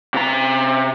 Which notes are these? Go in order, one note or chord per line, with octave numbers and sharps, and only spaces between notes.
C3 A#5